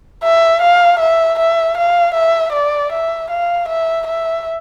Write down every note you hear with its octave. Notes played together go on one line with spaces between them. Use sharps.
E5
F5
E5
E5
F5
E5
D5
E5
F5
E5
E5